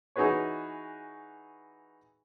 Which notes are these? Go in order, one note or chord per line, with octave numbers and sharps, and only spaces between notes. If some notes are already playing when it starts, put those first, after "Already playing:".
E3 D#4 F#4 G#4 B4 C#5